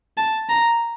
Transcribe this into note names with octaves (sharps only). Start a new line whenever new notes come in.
A5
A#5